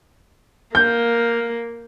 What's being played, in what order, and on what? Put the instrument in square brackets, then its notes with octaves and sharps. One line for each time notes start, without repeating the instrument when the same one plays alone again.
[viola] A#3 [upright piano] G6